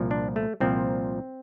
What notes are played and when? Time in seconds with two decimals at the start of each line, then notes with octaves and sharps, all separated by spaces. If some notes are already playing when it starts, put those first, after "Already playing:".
Already playing: C2 A#2 F3
0.11 D4
0.36 A3
0.60 C2 A#2 F3 C4